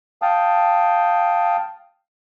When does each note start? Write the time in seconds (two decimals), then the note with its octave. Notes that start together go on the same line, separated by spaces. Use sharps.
0.22 F5 G5 A5 D#6